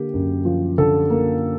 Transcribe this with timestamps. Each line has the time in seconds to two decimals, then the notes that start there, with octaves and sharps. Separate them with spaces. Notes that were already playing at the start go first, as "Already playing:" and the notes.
Already playing: D3 A#3 G4
0.14 F#2
0.45 F3
0.78 D3 A4
1.10 A#3